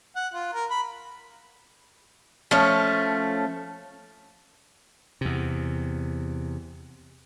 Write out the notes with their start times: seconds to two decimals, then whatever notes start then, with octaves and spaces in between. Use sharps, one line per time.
0.16 F#5
0.34 F4
0.53 A#4
0.70 B5
2.51 F3 A3 C#4
5.21 E2 C3